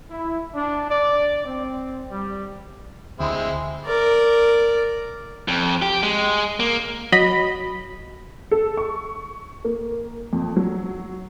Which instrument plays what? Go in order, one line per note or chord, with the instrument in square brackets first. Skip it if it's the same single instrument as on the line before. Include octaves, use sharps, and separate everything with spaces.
[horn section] E4
D4
D5
C4
G3
[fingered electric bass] D2 [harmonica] G#3 C4 E4
[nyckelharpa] A#4 D5
[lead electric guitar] F2
G4
G#3
A#3
[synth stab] F#3 D#5 B5
[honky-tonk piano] A4
C#6
A#3
F2
F#3